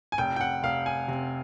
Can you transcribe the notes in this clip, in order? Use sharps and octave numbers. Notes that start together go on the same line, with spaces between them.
G#5
F1 G5
G5
F#5
F1 F5
G#5
C3